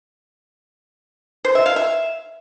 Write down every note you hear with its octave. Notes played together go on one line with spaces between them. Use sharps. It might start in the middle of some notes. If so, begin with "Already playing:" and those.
C5
E5
F5
E5